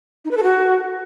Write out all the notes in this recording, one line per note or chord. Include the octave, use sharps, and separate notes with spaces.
D#4
B4
A4
F#4